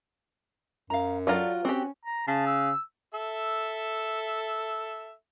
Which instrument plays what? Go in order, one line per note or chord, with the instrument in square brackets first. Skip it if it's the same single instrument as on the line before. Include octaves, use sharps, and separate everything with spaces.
[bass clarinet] F#2 [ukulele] F5 A#5
[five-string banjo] F#3 F4 A#5 [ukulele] G4 A4 D5
[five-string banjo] C4 G4 [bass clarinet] C#4 [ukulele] F#4
[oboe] A#5
[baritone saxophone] C#3 [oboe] A5
[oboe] E6
[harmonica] A4 E5